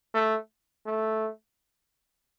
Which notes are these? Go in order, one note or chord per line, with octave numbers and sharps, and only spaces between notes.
A3
A3